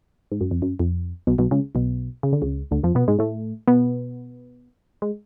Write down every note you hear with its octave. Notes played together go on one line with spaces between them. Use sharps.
G#2
F#2
F2
F#2
F2
B1 B2
B1 B2
C#2 C#3
B1 B2
C#3
D3
C#2 C#3
D2 D3
F2 F3
B2 B3
G#2 G#3
A2 A3
B2 B3
G#3